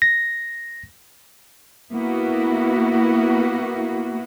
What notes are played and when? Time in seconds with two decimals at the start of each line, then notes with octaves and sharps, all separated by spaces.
0.02 A#6
1.92 A#3 B3 E4 F#4